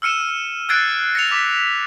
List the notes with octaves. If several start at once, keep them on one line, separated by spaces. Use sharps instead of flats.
E6 F6 C#7 D#7 E7
E6 F#6 G#6 A6 C7 D7
A#6 C#7 F7
D6 B6